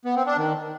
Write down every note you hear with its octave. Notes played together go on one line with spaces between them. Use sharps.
B3
C4
D4
D#3